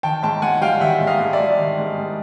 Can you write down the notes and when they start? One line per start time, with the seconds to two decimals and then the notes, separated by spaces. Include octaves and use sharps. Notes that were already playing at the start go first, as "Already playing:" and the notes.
0.03 D#3 G5 A5
0.23 G#2 G5 A5
0.42 G#2 F#5 G#5
0.61 G3 F5 G5
0.81 D#3 E5 F#5
1.01 G#2
1.07 D#5 F5
1.20 G#2
1.33 D5 E5
1.39 G3
1.59 D#3
1.78 G#2
1.98 G#2